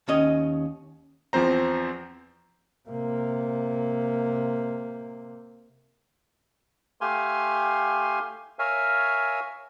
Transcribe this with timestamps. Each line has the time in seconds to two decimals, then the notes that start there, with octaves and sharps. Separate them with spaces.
0.08 D#2 C#4 D#5
1.33 E2 F3 C4 C5 A#5
2.89 C3 A#3
7.01 A3 G4 F5 G#5 C6
8.59 A#4 C#5 E5 F5 G#5